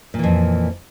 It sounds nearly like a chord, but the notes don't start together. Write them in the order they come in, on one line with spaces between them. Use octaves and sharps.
A#2 E3 F2